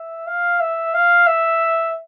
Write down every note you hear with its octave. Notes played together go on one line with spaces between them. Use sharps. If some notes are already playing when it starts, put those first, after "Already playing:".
Already playing: E5
F5
E5
F5
E5